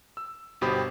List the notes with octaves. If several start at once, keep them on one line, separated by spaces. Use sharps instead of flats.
E6
G1 B2 G4 C5 B5 D#6